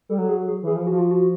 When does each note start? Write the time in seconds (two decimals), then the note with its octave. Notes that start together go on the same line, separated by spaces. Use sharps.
0.09 G3 A4
0.18 F#3
0.28 G#4
0.48 G#4
0.63 E3 G#4
0.76 F3
0.86 F3 F#4
0.99 F4
1.11 F#4